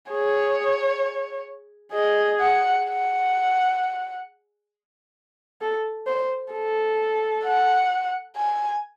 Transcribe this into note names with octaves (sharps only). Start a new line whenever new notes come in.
G#4 C#5
G#4 D#5
F#5
F#5
A4
C5
A4
F#5
G#5